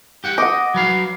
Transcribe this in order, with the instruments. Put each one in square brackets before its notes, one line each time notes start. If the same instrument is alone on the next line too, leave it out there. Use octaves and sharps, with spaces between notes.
[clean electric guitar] G4 F#5 G5
[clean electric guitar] D#5 [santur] F#5 D6
[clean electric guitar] F#3 B4 F5